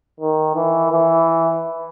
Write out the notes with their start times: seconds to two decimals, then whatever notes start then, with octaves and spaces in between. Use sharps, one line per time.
0.20 D#3
0.55 E3
0.92 E3